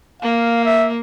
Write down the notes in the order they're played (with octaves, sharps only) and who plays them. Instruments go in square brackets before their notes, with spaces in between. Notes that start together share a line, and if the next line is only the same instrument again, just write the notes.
[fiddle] A#3 [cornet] F5
[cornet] E5